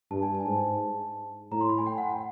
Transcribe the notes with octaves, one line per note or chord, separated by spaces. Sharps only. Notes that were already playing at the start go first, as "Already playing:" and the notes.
G2 A5
G#5
A5
G#5
G#2 A5
A2 A#5
C6
B5
G#5
G5
F#5
G5